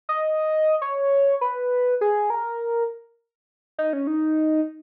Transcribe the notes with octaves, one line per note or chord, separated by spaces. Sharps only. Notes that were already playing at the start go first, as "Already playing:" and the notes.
D#5
C#5
B4
G#4
A#4
D#4
C#4
D#4